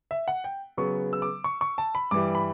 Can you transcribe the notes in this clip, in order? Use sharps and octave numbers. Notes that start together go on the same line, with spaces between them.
E5
F#5
G5
C#3 F#3 B3 C#6
E6
D6
C#6
C#6
A5
B5
G2 E3 G3 D6
B5